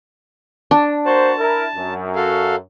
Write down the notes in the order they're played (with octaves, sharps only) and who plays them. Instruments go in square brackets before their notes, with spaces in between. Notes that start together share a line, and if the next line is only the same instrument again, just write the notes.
[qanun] D4
[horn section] A#3 F#4 C5 [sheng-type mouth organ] A5
[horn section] E4 A#4
F#2
[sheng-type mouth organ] F#4 A4 F5